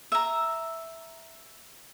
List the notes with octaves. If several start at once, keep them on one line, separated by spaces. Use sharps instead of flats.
E5 A#5